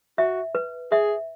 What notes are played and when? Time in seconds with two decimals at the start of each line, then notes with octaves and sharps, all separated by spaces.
0.18 F#4 E5
0.55 B4
0.91 G#4 E5